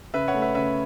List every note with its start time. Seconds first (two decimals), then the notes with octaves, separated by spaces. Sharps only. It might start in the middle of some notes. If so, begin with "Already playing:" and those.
0.14 C#3 B4 E5
0.28 C#5 F#5
0.34 A3
0.42 B4 E5
0.55 C#3 B4 E5